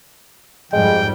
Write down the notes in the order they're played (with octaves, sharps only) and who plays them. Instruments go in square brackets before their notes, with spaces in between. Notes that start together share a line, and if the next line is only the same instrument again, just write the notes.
[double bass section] F2 G#2 G3 [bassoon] G#3 [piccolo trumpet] G5